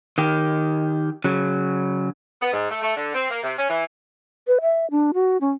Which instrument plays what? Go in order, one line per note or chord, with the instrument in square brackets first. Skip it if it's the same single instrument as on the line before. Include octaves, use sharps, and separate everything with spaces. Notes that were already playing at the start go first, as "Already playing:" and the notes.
[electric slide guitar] D#3 G4
C#3 F#3
[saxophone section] B3
G#2
A3
A3
D3
C4
A#3
C3
C#4
E3
[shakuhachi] B4
E5
D4
F#4
C#4